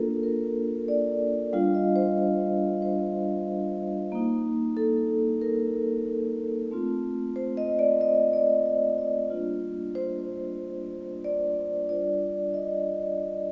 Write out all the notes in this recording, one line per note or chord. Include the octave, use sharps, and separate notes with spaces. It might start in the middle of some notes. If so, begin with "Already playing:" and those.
Already playing: A#3 D4 F4 A4 A#4
A#4
D5
G3 D4 F4 F5
D#5
C5
C5
C5
A#3 D#4
A4
A#4
A3 C4 F4
C5
D#5
D5
D#5
D5
D#5
D#5
G3 A#3 D4 F4
C5
D5
G3 D4 F4 D5
D#5